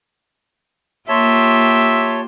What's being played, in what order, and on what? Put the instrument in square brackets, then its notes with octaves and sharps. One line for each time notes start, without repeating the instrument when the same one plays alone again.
[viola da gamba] A#3 F4 G4 [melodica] C#5 A5 [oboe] E5 [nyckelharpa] C6